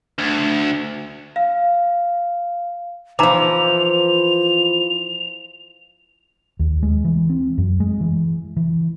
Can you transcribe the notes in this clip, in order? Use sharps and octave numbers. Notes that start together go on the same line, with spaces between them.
D2
F5
E3 F3 D#4 A#5 D6 F7
D#2
G#3
E3
C4
F#2
G#3
E3
E3